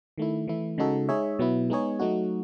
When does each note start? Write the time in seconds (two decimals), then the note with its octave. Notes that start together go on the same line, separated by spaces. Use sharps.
0.18 D#3 A3 E4
0.48 E3 A3 E4
0.78 C#3 G#3 D#4 F#4 A4
1.09 G#3 D#4 G#4 C#5 E5
1.39 B2 F#3 B3 E4
1.70 G#3 B3 D#4 G#4 C#5
1.99 F#3 A3 D#4 F#4